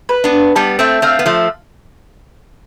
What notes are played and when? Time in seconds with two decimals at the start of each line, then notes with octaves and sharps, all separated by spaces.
0.09 B4
0.24 B3 D4
0.55 G3 B3 A5
0.79 A3 C4
1.02 A3 C4 F5
1.19 B3
1.26 F3 A3